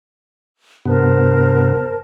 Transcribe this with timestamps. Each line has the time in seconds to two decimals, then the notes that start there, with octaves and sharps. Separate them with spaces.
0.85 G2 C3 B3 A#4 C5 A5